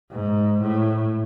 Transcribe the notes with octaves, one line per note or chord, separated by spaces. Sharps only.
G#2
A2